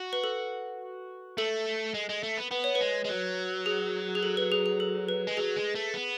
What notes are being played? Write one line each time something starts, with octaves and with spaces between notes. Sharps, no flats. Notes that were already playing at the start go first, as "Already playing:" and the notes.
Already playing: F#4
B4
A4
A3 A4
G#3
G#3
A3
B3
B3 B4
C#5
B4
G#3
G#3
F#3
G#4
G#4
A4
B4
G#4
G#4
A4
B4
G#3
F#3 G#4
G#3
A3
B3